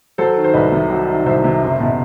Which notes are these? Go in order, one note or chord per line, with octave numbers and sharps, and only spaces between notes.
F#3 A4 C5
D#3
C5
C2 B4 D#5
C3
F#3
D#3
C2 C5 E5
C3
F#1
B2